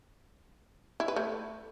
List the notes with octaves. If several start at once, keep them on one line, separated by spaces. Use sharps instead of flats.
E4
B4
A3